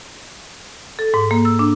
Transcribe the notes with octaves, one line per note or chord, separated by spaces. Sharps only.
A4
G#2
A#3
E6
D4